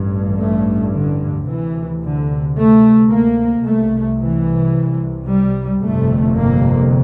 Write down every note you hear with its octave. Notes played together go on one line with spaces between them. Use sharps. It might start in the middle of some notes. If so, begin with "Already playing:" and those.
Already playing: A1 G2
A3
D3
D2 C3 E3
D3
A3
A#3
C2 C3 A3
E3
G3
G1 F2 C3 A3
A#3